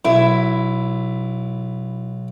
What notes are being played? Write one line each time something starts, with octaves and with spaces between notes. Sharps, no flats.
B1 E4